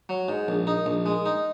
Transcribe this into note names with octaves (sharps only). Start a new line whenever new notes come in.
F#3
G#2
A#1
D#4
A#1
G#3
D#4